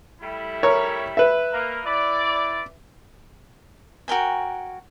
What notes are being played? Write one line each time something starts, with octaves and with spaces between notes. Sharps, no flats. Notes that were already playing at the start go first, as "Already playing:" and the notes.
G3 A3 E4
A#4 C#5
B4 E5
A#3 A#4
E4 D5
F#4 A#4 G5 G#5